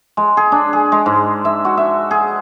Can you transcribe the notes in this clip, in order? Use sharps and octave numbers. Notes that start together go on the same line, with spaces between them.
G#3
G#4
D4
G#4
G#3
G#2
E5
F#4
E5
G#4